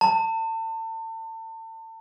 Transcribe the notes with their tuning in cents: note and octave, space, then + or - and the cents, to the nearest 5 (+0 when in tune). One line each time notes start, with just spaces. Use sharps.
A5 +35